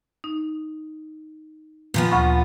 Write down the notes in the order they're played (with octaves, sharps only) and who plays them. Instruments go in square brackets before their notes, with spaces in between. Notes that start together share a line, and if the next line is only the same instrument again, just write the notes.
[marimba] D#4
[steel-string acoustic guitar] A#2 F3 B3
[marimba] D2 B5 C#6